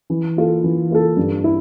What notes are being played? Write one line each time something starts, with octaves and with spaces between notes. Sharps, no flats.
E3
A#3 F4 A4
E3
A#3 F4 A4
G2
E4